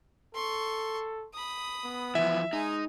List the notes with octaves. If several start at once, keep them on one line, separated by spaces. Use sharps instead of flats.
A4 C6 C#6
B5 D#6
B3
E3 F3 E5
G#3 D#4 G#5